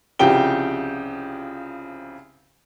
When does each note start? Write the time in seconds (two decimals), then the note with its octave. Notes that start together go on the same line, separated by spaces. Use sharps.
0.19 C2 C#3 F3 G4 G5 G7